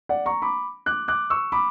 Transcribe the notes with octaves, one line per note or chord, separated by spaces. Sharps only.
D5 F#5
A#5 C#6
B5 D6
D6 F#6
D6 F#6
C#6 E6
B5 D6